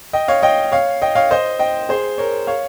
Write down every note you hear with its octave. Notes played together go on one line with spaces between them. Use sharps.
D#5 G5
C#5 F5
D#5 G5
C#5 F5
D#5 G5
C#5 F5
C5 D#5
D#5 G5
G#4 C5
A#4 C#5
C#5 F5